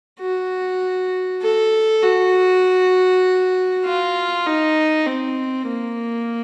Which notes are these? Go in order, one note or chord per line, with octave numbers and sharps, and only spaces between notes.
F#4
A4
F#4
F4
D#4
C4
A#3